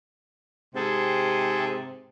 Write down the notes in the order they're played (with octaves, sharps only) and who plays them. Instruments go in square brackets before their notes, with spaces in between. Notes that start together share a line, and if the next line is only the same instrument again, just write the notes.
[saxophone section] G#2 C3 [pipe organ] G#4 A4